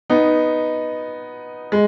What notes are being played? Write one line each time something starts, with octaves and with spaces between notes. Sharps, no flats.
B3 D#4
G#3